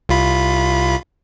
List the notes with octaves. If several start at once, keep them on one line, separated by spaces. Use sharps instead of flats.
C2 F4 B5